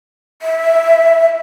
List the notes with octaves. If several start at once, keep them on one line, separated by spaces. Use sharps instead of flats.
E5